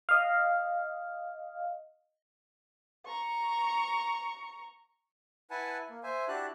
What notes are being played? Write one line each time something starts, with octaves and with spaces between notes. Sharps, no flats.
D#5 F5
A#5 C#6
E4 B4 F#5 G#5 A5
A#3
C5 E5 G#5
D4 E4 F#4 G4 A5 F#6